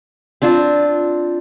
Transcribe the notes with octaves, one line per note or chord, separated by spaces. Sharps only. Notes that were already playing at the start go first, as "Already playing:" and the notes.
C4 D4 F4